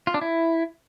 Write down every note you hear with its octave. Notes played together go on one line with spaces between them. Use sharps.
F4
D4
E4